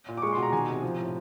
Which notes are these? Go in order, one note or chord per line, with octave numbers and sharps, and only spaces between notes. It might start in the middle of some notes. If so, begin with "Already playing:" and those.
A#2
D6
G#3 C#6
C6
B2
A#5
D#3 G#5
C3
F3
A2